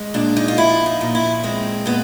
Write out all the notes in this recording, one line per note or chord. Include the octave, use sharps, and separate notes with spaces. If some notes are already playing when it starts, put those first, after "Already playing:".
Already playing: G#3
A#2 D4
D#4
F4
F3 E4
D#4
A#2
E4
G#3 C4
A#2 B3